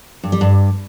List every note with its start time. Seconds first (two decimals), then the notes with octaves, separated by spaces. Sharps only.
0.23 G2
0.32 G3
0.41 G2